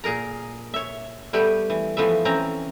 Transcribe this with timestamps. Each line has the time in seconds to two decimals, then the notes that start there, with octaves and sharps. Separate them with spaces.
0.04 A#2 G#4 A#4 A#5
0.74 C#5 E5
1.33 G3 A3 B3 G4
1.70 E3
1.97 E3 F3 A3 B3 E5
2.25 E3 C4 C#4 A#5